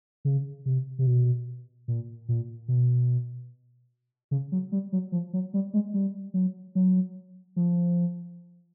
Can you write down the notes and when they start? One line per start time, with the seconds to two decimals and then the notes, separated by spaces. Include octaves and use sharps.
0.25 C#3
0.66 C3
0.99 C3
1.07 B2
1.88 A#2
2.29 A#2
2.68 B2
4.31 C#3
4.52 F#3
4.72 G3
4.92 F#3
5.12 F3
5.33 F#3
5.54 G3
5.74 G#3
5.94 G3
6.34 F#3
6.75 F#3
7.56 F3